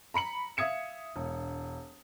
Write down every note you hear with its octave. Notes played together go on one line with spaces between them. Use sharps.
A#5 B5 C#7 F#7
E5 F5 D#6 G#6 C#7 E7
E1